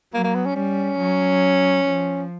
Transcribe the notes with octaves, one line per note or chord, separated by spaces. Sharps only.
F#3 A#3
A#3
B3
C#4
G3 C#4
F#3
F3